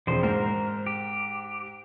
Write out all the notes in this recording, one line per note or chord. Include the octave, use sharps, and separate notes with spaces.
E1 F3 C4 C5
G#2 A#4 C5
G4